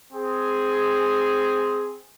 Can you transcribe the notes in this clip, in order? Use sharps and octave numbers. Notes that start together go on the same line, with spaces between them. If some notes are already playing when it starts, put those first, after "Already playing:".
C4 G#4